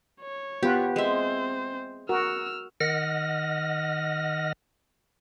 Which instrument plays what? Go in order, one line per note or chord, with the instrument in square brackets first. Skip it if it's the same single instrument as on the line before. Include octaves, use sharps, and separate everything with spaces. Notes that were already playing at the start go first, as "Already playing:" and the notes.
[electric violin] C#5
[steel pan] B3 F4 B4 [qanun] G4
[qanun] G#3 E5 [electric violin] C4 C5
[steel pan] F#4 A#4 [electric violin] E6 F6
[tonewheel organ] D#3 D#5 F#5 F6 A#6